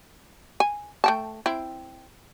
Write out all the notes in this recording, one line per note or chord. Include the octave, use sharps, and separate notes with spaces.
G#5
A3 G5 A5
C4 E4